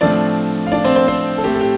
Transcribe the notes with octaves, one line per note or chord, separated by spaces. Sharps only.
A2 F3 A3 C4 D4 D5
F5
D4 D5
C4 C5
C4 C5
C4 C5
A4
A2 A3 C4 G4
A4
G4